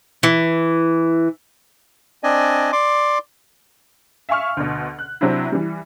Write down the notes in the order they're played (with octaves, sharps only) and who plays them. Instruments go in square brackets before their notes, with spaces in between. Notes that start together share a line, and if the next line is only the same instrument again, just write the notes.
[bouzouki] E3
[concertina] C4 D4 D5 D#5 G#5
D5 C6 D6
[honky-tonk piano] E5 F5 G#5 C#6 F6
D2 B2
F#6
C3 F#3 C4 D4 E4
E3 G3